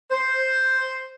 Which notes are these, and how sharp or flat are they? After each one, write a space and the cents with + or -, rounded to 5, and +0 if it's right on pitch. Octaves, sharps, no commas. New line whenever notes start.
C5 +0